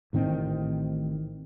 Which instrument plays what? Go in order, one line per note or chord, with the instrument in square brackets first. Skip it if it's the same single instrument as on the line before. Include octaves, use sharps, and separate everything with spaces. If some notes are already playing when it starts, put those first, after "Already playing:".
[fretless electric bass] A1 A2 D#3 C4